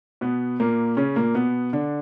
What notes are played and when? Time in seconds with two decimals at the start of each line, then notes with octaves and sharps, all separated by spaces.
0.21 B2 B3
0.60 A#2 A#3
0.97 C#3 C#4
1.16 A#2 A#3
1.35 B2 B3
1.73 D3 D4